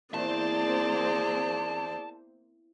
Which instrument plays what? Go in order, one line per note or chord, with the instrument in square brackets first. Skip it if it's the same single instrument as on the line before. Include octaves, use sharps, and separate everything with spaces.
[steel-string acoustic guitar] E2 [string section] A#3 C4 C5 [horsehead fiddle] G#4 D5 [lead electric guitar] A5